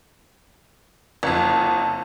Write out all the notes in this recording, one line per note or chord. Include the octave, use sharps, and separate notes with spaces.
F#1 F2